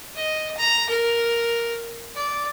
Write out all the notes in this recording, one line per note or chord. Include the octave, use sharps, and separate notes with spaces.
D#5
A#5
A#4
D5